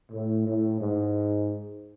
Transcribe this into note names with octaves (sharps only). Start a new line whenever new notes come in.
A2
A2
G#2